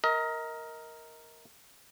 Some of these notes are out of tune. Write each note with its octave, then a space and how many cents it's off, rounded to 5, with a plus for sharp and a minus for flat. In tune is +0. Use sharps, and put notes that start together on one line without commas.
A#4 +0 D#5 +30